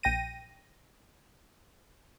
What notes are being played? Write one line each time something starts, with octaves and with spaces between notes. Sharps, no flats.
A#1 G5 A#6 D#7